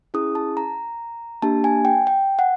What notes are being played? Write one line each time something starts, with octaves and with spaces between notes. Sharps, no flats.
C#4 E4 G#4 D#6
A5
A#5
A#3 D4 G4 A5
G#5
G5
G5
F#5